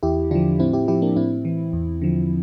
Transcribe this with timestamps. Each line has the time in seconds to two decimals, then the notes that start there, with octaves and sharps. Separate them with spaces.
0.03 E2 E4 G4
0.31 D3 F3 D4 F4
0.59 A2 C4 E4
0.73 E4 G4
0.88 F3 E4 G4
1.02 A#3 D4
1.16 A2 C4 E4
1.45 E3
1.73 E2
2.02 D3 F3